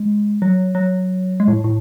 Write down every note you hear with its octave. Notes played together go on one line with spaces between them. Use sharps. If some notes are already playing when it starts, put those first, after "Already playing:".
Already playing: G#3
F#3
F#3
G#3
A2
A2